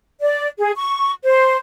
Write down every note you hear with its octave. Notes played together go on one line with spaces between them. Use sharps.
D5
G#4
C#6
C5